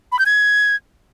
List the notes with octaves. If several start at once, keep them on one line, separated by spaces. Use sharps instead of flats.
B5
G6
G#6